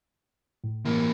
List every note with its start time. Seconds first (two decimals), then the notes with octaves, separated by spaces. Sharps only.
0.64 A2
0.85 E3 A#3